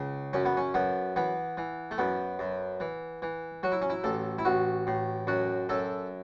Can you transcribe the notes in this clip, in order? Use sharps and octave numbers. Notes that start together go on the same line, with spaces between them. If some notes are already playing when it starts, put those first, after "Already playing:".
Already playing: C#2 C#3
F#2 C#4
B3
C#4
F#2 B3
E3 B3
E3
A3
F#2 B3
F#2
E3
E3
F#3 F#4
E4
C#4
E4
A1 A4
E4
A1 F#4
A2
F#2 F#4
F#2 A4